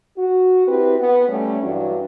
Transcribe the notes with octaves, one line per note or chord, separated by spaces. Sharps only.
F#4
C4 E4 G4 B4
B3
G3 A3 C#4
G2 E3 F#3 D4